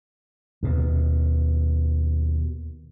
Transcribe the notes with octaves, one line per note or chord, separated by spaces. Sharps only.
D#2 B2